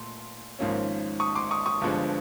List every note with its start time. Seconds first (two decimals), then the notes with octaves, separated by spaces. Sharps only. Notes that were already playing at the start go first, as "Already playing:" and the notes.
Already playing: A#2 A3 C6
0.59 G#1 G#2 F3 A#3 C#4
1.20 C#6 D#6
1.35 C6 D6
1.51 C#6 D#6
1.66 C#6 D#6
1.81 G1 G2 D3 F3 G#3